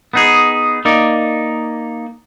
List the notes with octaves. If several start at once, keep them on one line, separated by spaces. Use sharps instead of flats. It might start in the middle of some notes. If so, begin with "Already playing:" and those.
B3 D#4 G#4
A#3 D#4 D5